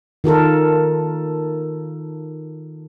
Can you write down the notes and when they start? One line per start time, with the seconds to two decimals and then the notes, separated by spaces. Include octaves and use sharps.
0.24 D#3 F4 A4 A#4